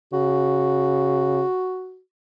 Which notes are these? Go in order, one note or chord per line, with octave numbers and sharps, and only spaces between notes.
C#3 F#4